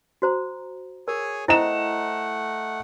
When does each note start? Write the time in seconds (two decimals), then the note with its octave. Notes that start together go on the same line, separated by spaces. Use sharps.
0.22 F#4 C5 A#5
1.08 G#4 A#4 C#5 G#5
1.48 A3 E4 C5 D#5 F#5 G5 A#5 E7